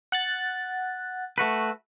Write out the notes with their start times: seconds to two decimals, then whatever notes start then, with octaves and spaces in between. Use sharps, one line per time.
0.12 F#5 F#6 A6
1.38 A3 F#4 B4